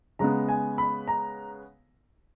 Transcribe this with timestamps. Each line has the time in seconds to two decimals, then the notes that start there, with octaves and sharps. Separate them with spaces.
0.19 C#3 G#3 B3 A#5
0.48 G#5
0.78 B5
1.08 A#5